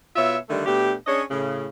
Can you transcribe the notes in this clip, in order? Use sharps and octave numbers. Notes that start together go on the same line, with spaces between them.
B2 F4 C#5 E5
D3 D#3 G3 A3
B2 A3 D4 G4
C#4 D4 G#4 C#5 D#5
A2 C#3